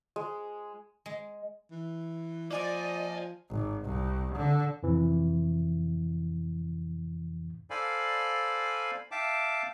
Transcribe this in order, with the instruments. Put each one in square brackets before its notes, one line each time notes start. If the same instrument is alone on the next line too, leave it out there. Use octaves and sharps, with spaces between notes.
[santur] G#3
[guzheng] G#3
[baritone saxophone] E3
[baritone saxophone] F3 [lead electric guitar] A#3 G#5 [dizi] D5 [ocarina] D#5
[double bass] G#1
C2
D3
[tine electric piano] F2 C3 E3
[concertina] A4 C5 D5 F5 G#5 B5
E5 F5 G5 A5 D6